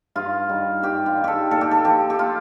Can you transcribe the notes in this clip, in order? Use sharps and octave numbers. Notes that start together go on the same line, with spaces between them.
G2 F4
D#3 G3
G2 G4
F4
D#3 G3
G4 A4
A#2 A4
G4
A4
F3 G4
G4
F4